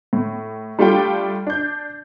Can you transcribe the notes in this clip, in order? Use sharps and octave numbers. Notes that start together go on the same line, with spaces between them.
A2
G3 A3 D4 F4 G4 G5
D4 G6